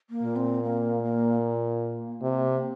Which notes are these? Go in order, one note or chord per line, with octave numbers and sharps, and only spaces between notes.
A#3
A#2
C4
A#3
A#3
A#3
C3